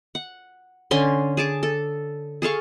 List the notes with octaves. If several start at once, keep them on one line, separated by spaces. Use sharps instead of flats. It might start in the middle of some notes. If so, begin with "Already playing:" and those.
F#5
D3 C#4 C6
G#4 A5 D6
A4
G#4 A4 F5 C#6